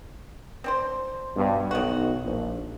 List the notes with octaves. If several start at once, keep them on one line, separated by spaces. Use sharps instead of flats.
C4 D4 C5
G2 B2
B1 D#3 F#4
A#1